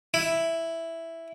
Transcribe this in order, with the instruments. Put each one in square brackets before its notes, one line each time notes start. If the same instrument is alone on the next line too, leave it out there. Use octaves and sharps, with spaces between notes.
[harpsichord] E4